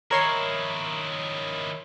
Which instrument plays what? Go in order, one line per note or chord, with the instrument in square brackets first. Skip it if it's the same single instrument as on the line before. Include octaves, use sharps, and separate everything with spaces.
[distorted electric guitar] D#3 E4 [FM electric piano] A#4 C#5 C6